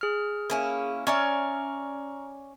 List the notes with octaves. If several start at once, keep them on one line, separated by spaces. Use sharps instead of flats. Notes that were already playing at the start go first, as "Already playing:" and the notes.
G#4 F6
A#3 C#4 E4
C#4 D5 E5 A#5 C#6 F6